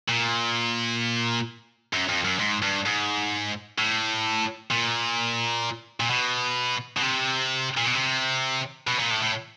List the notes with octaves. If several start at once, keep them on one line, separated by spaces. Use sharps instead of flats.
A#2
F#2
F2
F#2
G#2
G2
G#2
A2
A#2
A#2
B2
B2
C3
A#2
B2
C3
B2
A#2
A2
A2